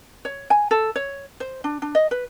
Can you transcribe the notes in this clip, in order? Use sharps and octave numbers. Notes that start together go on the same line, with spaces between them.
C#5
G#5
A4
C#5
C5
D4
D4
D#5
B4